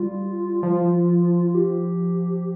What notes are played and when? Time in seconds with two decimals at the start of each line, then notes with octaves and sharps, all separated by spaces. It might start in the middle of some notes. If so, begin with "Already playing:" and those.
Already playing: G3 F4
0.63 F3
1.55 G4